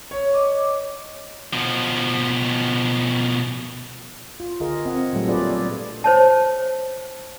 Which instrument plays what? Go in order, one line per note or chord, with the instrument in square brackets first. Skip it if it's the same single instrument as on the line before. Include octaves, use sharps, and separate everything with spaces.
[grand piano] C#5
[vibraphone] D#5 D6
[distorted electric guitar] B2 F3
[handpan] F4
D3 F4 G#4 A#4 D#5
C4 D#5 F#5
A#2 F#3 G3 A3 A4
D4 F4 G#4 B4 D5
D5
[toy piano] C5 C#5 A5